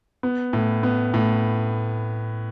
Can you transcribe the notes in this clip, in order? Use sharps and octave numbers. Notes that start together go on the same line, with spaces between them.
B3
A2
B3
A2